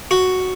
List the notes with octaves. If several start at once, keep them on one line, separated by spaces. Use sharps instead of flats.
F#4